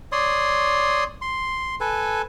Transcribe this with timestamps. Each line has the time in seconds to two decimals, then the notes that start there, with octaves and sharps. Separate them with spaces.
0.12 C#5 D5 C6 D#6
1.21 C6
1.80 A4 B4 G#5